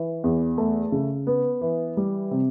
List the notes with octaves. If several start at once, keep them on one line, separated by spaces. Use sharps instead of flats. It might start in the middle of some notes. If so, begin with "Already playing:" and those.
Already playing: E3
E2
A3
C#3
B3
E3
G3
C3